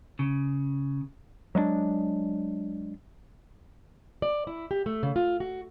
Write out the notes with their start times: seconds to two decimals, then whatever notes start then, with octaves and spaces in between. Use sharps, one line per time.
0.19 C#3
1.55 F#3 G#3 B3 D4
4.22 D5
4.47 E4
4.71 G4
4.86 A3
5.03 C#3
5.16 F4
5.40 F#4